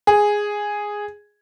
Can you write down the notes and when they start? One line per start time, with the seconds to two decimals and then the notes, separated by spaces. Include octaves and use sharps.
0.07 G#4